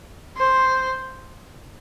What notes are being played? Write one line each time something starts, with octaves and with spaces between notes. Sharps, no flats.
C5